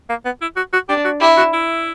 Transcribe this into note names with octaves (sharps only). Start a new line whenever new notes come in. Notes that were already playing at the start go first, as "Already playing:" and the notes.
A#3
B3
E4
F#4
F#4
D4 G4
F#4
E4 G4
F#4
E4